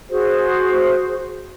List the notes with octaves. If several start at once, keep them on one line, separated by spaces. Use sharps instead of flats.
F#4 G#4 C5